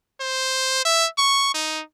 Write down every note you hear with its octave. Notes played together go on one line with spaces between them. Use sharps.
C5
E5
C#6
D#4